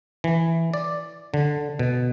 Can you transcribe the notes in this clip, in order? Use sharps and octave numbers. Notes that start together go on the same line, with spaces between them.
E3
D5
D3
B2